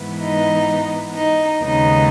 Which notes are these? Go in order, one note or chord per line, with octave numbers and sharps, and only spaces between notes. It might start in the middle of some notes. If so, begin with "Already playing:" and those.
Already playing: G#2 E3 B3
D#4
D#4
D#2 C#3 G#3 B3 D#4